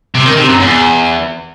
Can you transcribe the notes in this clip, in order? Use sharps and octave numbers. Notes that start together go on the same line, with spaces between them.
C3
D#3
C3
F#2
E2